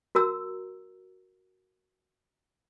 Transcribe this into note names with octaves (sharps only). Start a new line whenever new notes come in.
F#4 A#4 A#5 E6